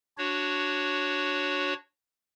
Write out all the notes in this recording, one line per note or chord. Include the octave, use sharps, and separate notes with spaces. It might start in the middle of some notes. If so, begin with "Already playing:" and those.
D4 F#4 C#5